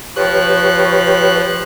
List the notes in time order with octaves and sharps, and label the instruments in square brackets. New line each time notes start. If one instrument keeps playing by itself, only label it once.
[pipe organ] F3 F#6 [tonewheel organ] G4 B4 C#5